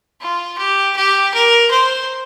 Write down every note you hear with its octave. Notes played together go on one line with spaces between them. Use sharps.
F4
G4
G4
A#4
C5